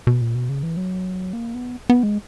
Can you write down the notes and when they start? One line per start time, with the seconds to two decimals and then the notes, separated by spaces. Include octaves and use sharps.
0.07 B2
0.21 A#2
0.35 B2
0.49 C#3
0.63 E3
0.77 F#3
1.33 A#3
1.54 B3
1.90 B3
2.03 G#3